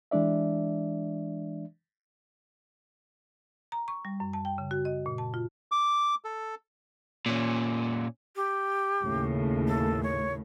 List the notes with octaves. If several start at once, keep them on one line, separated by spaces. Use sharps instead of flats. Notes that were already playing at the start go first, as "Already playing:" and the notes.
E3 G#3 D4 D5 E5
A#5
C#6
G3
F#2
A5
G5
C#3
F#4
D#5
A#2
A5
F4
D6
A4
A#2 C#4
G4
D#2 A2 C#3
A4
C#5